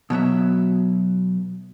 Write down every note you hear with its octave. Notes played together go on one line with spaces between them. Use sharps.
B2 F#3 B3 E5